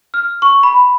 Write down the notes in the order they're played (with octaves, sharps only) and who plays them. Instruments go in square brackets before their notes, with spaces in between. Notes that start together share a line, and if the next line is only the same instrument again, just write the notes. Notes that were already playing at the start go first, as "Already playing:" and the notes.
[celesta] F6
C#6
B5